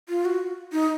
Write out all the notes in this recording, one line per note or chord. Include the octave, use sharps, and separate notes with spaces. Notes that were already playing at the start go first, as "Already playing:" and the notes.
F4
F#4
D#4